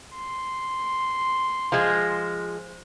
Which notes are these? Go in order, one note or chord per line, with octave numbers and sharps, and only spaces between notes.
C6
F3 G#3